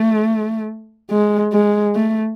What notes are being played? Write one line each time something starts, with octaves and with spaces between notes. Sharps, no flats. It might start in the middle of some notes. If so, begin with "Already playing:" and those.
Already playing: A3
G#3
G#3
A3